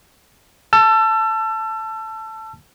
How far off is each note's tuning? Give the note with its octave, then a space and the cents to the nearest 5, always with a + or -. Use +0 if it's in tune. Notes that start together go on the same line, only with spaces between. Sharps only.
A5 +0 E6 +35